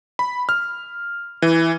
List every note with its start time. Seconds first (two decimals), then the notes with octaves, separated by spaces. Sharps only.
0.19 B5
0.49 F6
1.42 E3